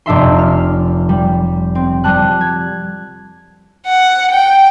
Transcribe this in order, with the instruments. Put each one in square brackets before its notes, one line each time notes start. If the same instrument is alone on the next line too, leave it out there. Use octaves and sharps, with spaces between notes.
[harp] F1 D4 E5 C6
F6
G3
C4
G3 A5 F#6
G#6
[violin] F#5
G5